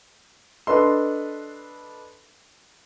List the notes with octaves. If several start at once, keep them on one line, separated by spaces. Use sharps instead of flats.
D4 A4 B4 D#5 C6